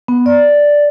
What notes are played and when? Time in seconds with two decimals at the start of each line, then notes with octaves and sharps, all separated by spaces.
0.08 B3
0.26 D5